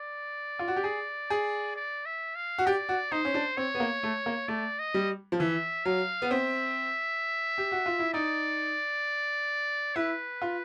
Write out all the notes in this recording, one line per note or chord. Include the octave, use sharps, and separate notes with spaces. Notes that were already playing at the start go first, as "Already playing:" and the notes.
Already playing: D5
F4
F#4
G4
G#4
G#4
D5
E5
F5
F#4
G4 D5
F#4
D#4 C5
C#4
D4
C4 C#5
B3
A#3
A3
A#3
A3 D5
D#5
G3
F3
E3 E5
F#3 F5
B3
C4 E5
G4
F#4
F4
E4
D#4 D5
E4 B4
F4